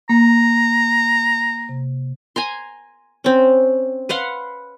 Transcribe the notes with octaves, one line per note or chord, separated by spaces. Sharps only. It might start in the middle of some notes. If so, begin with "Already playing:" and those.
A#3 A#5
C3
G#5 A#5 C6
C4 C#4
B4 F5 F#5 C6